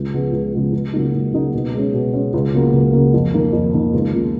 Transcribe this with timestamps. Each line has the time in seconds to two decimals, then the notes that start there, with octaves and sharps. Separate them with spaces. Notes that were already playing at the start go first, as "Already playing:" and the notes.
Already playing: C#2
0.13 C#3 F3 G#3 B3
0.33 C#2
0.53 C#3 F3 G#3 B3
0.73 C#2
0.93 C#3 F#3 A#3 D#4
1.14 C#2
1.33 C#3 F#3 A#3 D#4
1.54 B2
1.74 G#3 C#4
1.94 B2
2.13 G#3 C#4
2.34 C#2
2.54 C#3 F#3 A#3
2.73 C#2
2.93 C#3 F#3 A#3
3.14 F2
3.34 D#3 A#3
3.53 F2
3.74 D#3 A#3
3.94 C#2
4.14 C#3 F3 A#3